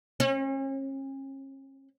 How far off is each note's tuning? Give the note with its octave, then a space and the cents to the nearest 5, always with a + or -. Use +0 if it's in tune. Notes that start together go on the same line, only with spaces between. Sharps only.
C#4 -40